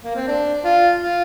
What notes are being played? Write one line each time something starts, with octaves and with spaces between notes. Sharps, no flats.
A#3
C4
D4
F4
F4